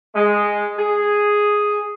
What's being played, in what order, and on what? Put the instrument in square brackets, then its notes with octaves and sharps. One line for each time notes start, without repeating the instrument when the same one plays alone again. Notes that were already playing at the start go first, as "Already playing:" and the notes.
[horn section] G#3
G#4